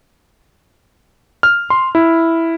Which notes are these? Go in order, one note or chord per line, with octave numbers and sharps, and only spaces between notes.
F6
C6
E4